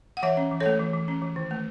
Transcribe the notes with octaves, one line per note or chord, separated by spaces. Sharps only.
F#5
E3 C#5 E5
C#4
E3
A4 C#5
A3
E3
E3
C#4
E3
D#3
A3